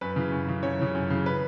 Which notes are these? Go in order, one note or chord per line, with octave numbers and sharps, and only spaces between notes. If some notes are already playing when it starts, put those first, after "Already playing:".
F#2 B4
C#3 E3
F#2
C#3 E3
F#2 C#5
C#3 E3
F#2
C#3 E3
B4